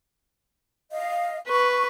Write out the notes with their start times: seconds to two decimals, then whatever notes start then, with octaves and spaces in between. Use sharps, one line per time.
0.91 D#5 F5
1.49 B4 C#6